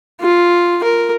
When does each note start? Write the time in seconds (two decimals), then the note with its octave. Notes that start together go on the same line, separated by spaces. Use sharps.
0.21 F4
0.84 A#4